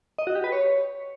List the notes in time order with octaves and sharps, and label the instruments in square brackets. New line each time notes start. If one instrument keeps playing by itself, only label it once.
[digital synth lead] D#5
F#4
G4
B4
C#5